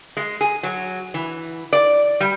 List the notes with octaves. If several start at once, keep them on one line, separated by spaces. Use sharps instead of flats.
G#3
G#4
F#3
E3
D5
G3